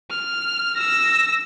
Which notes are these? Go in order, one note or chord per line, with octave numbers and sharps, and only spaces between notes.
F6
E6 A#6